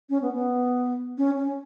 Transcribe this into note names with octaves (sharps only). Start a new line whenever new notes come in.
C#4
B3
B3
C#4
C#4